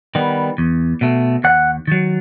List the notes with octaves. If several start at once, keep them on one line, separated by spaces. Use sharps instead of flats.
D#3 G3 B3
E2
B2 A3
D#2 F#5
D#3 F#3